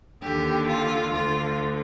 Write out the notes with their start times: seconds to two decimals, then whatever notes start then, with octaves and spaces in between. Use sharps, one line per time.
0.22 D#2 D3 G4
0.69 F4
1.13 D2 D3 F4